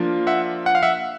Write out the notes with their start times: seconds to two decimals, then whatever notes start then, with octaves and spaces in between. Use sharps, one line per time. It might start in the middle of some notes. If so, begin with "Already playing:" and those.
Already playing: F3 A#3 D4 F4
0.27 E5 F#5
0.66 F#5
0.75 F5
0.83 E5 F#5